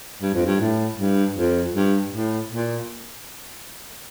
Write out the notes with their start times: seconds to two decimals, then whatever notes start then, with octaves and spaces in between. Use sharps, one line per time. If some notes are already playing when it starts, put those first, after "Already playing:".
0.22 G2
0.34 F2
0.46 G2
0.60 A2
0.98 G2
1.37 F2
1.74 G2
2.13 A2
2.51 A#2